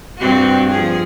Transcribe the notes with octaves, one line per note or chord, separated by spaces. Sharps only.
G2 C4 F#4
F3 G#4